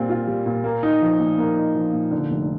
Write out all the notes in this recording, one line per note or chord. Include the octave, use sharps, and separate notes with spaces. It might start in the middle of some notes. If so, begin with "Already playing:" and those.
Already playing: A#2 G3 C4
F4
G3
A#2
A#3
D#4
F3
A#2
A#3
D#4
F3
A#2
D3
F1